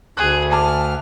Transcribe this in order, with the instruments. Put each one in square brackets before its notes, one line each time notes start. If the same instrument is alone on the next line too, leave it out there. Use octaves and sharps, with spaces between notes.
[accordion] D2 [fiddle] G#4 [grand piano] F#6
[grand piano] G#5 A5 D6 [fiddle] F6